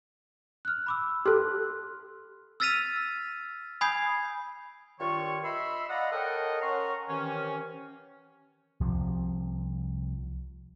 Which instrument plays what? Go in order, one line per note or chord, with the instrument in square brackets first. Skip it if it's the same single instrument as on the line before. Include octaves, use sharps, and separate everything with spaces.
[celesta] F6 F#6
B5 D6 E6
[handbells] G4 A4 [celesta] C6 F6 F#6
[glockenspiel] E6 F6 A6 B6 D#7 F7
G#5 B5 D#6 G6 G#6 C7
[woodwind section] G2 D#3 F4 C#5 C#6
D#5 E5 B5 C6 E6
D5 D#5 F5 F#5 A#5 B5
A4 A#4 C#5 D#5 F#5 G5
C#4 A#4 F#5 A#5 C6 C#6
C3 D#3 E3 C#4
[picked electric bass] C2 C3 F3